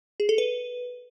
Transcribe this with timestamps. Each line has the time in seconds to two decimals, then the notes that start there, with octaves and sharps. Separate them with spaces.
0.20 G#4
0.29 A4
0.38 B4